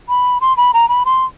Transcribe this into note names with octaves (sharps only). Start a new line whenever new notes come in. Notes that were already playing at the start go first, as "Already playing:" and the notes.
B5
C6
B5
A#5
B5
C6